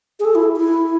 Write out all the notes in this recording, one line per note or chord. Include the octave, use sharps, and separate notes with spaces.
G#4
A4
E4
E4